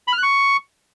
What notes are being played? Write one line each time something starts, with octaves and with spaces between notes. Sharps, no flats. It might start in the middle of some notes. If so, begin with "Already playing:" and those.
B5
F6
F#6
C#6